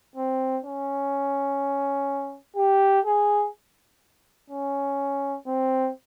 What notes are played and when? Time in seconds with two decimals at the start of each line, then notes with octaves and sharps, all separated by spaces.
0.15 C4
0.64 C#4
2.56 G4
3.05 G#4
4.50 C#4
5.47 C4